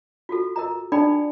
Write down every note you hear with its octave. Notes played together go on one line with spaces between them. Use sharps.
F4 F#4 A4
A#4 D#5 A#5
D4 D#4 A4 D5 G5 B5